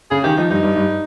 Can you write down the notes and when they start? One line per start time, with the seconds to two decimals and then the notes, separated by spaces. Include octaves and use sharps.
0.11 C#3 G#4
0.24 D#3 G4
0.37 F3 D#4
0.50 G2 D#4
0.63 G2
0.76 G2